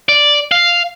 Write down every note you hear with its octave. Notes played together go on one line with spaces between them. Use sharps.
D5
F5